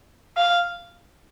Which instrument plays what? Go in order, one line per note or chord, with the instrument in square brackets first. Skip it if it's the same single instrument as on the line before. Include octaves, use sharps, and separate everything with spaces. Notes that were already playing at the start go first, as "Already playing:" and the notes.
[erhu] F5